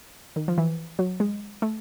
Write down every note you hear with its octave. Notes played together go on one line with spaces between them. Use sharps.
D#3
F3
E3
F#3
G#3
A3